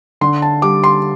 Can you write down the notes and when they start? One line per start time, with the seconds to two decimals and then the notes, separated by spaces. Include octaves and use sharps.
0.21 D3 C6
0.42 A5
0.62 G3 D6
0.84 C6